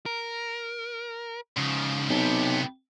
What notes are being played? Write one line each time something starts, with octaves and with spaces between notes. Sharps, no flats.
A#4
G#2 C#3 F3
B1 C3 B3 G4